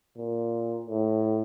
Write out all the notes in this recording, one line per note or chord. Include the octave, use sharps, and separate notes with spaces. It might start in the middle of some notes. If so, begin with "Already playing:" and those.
A#2
A2